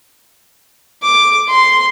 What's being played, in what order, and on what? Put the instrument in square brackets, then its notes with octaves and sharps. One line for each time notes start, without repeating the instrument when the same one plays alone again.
[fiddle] D6
C6